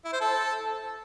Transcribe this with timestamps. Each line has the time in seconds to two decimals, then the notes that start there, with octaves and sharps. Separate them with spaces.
0.05 E4
0.13 C5
0.21 A4